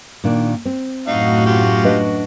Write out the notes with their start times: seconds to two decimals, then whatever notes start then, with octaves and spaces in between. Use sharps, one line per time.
0.24 A#2 D#3 D4
0.65 C4
1.07 F#2 A2 D#4 F#4 F5
1.46 F4 G4
1.84 D4 B4 D#5